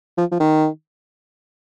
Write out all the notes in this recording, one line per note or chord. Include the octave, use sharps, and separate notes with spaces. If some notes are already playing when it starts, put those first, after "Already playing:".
F3
F3
D#3